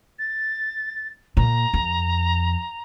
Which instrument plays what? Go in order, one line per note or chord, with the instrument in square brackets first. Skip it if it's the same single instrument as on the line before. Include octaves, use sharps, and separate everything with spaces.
[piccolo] A6
[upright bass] A#2 [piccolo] A#5
[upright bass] F2